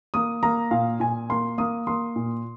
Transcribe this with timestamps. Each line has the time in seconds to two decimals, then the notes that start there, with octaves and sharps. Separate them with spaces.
0.14 A#3 D#6
0.43 A#3 A#5
0.71 A#2 F5
1.00 A#2 G#5
1.29 A#3 C6
1.58 A#3 D#6
1.87 A#3 C6
2.16 A#2